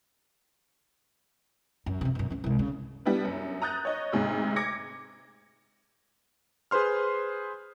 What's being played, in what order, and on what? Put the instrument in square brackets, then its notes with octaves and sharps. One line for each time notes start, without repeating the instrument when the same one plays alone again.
[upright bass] F#2
F2 C3
F#2 B2
D2 C#4
C2 G#3
C#3
[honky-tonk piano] G3 B3 D4 E4 B4
F#2
A#5 D#6 F#6 G6 A6
C#5 D#5 C#6
D2 G#2 C3
D6 G#6 A#6 C#7
[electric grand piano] G#4 B4 C5 C6 F6